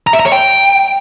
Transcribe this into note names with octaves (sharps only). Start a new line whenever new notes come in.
A#5
E5
A#5
C#5
G5